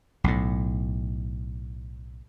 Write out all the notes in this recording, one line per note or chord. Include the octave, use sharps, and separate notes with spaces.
B1 A2